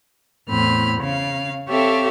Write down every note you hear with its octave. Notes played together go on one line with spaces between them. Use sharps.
E2 A2 C4 B5 F6
C#3 F5
C4 G4 A4 C#5 E5 F5